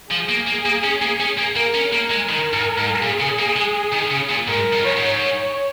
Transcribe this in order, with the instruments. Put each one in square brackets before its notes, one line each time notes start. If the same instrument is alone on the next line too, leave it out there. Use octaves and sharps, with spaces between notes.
[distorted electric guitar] F3 [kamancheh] G#4
[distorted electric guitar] A#3
A#3
A#3
C#4
A#3
C#4
A#3
[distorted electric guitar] A#3 [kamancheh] A#4
[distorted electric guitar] C#4
[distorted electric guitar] A#3 [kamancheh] A#4
[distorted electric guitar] G#3
[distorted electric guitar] D#3 [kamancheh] A#4
[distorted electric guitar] G#2
G#2
[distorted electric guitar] A#2 [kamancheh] G#4
[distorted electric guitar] C#3
A#3
G#3
D#3
C#3
A#2
[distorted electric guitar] G#2 [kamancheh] A#4
[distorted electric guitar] F2
[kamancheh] C#5
[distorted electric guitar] G#2
[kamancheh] C#5